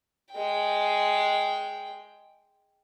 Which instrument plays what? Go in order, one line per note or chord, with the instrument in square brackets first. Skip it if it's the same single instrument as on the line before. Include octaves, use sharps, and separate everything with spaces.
[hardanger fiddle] G#3 G5